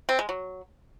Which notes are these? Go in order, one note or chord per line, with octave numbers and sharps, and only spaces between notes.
C4
G#3
F#3